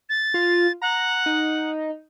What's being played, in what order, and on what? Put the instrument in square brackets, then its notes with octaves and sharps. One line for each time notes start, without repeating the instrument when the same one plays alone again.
[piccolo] A6
[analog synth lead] F4
[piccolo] F#5 [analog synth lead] A#5
[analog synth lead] D#4